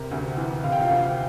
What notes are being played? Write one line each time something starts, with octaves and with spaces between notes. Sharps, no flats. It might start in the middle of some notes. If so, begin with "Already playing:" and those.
Already playing: C3 A#4 A#5
D2
E3
C3 F5
G5
F4 F5
D2